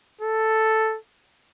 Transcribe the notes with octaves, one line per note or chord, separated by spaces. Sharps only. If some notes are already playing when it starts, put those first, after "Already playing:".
A4